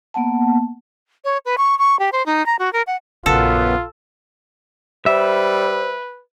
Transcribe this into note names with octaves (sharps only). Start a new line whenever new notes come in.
A#3 B3 F#5 A5
C#5
B4
C#6
C#6
G4
C5
D#4
A#5
F#4
A#4
F#5
A#1 F#2 C#3 B3 F4 A4
G3 B4 C5 E5